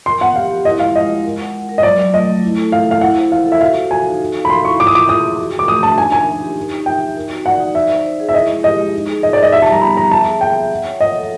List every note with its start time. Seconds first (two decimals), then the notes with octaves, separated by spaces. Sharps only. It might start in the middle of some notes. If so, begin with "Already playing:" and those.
0.06 A#4 C6
0.21 B3 F#5
0.35 G4 F5
0.50 G4
0.65 E4 D#5
0.80 G#3 F5
0.96 G#3 D#5
1.09 G#3
1.25 A#4
1.40 F#5
1.55 F#5
1.69 A#4
1.78 D#5
1.83 F#3 D5
1.98 F#3
2.13 A3 D#5
2.29 A3
2.42 E4
2.57 A4
2.72 A4 F5
2.88 E4 F5
3.01 E4 F#5
3.16 C5
3.32 C5 F5
3.46 A4
3.52 E5
3.61 F#4 F5
3.76 F#4
3.90 F#4 G#5
4.06 D#4
4.21 A4
4.34 F5
4.45 B5
4.50 F5 C6
4.65 E4 C#6
4.80 F4 D6
4.87 D#6
4.94 F4 D6
5.08 G#4 D#6
5.24 G#4
5.38 F#4
5.54 F#4
5.59 D6
5.68 A3 D#6
5.83 D4 A5
5.98 D#4 G#5
6.12 A#4 G#5
6.28 D#4
6.42 G4
6.57 D#4
6.71 D#4
6.86 E5 G5
7.02 D#4
7.16 A#4
7.30 F#4
7.46 D5 F#5
7.60 D#4
7.75 D#4 E5
7.90 C5
8.05 C5
8.20 G#4
8.29 E5
8.34 E4 D#5
8.49 G#3
8.63 G4 D#5
8.78 G#3
8.93 D#4
9.09 G#4
9.23 D#4 D#5
9.33 D5
9.38 D#4 D#5
9.52 G4 E5
9.62 A5
9.67 G3
9.72 A#5
9.82 B3 B5
9.97 B3 A#5
10.12 E5 A5
10.26 G#4
10.41 E5 G5
10.56 E5
10.71 F#5
10.86 C#5
11.00 D#5 F#5
11.16 A4